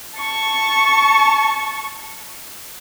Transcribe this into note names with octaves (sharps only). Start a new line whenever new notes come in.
A5 C#6